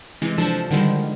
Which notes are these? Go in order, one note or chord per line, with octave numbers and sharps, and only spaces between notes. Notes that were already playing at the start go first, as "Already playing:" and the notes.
C3 E3 G#3
F3 D4 A4 A5
D3 D#3 F3 G3 G#3